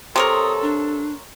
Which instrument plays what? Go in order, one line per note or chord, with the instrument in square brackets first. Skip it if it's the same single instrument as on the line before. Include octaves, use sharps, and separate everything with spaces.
[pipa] C3 [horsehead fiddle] A4 [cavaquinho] A#4 C#5 C6 [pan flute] D#6
[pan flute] D4